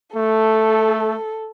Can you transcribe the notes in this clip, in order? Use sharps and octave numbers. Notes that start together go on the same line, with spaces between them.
A3 A4